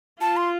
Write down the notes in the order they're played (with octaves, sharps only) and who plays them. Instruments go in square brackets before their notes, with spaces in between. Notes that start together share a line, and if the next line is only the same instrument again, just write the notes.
[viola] F4 [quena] A5
[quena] C6